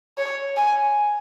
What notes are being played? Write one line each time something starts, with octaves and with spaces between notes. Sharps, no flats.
C#5
G#5